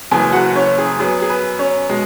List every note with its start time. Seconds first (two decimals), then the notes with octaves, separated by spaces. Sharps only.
0.11 F#1 F#2 E3 G#4 G#5
0.33 F#4 F#5
0.55 C#4 C#5
0.78 G#4
0.99 F#2 F#3 B3 G#4
1.22 G#4
1.30 B4
1.59 C#4 C#5
1.89 B2 G#3